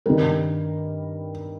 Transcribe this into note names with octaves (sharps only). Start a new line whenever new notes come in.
G2 D#3 G3 A#4